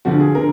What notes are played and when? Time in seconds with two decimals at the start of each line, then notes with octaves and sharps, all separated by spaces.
0.05 D2 D3 F3 F#4
0.20 G#4
0.35 D3 A#4